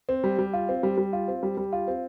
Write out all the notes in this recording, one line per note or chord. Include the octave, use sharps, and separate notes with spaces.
C4
G3
G3
F4
C4
G3
G3
F4
C4
G3
G3
F4
C4